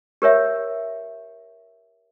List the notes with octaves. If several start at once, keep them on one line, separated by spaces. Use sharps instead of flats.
G4 A#4 C#5 E5